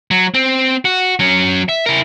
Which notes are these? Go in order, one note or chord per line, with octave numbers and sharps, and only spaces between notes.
F#3
C4
F#4
F#3 C#4
E5
E4 A#4